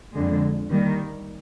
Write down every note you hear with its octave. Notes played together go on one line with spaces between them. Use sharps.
F2 D3 G#3
D#3 G3 A#3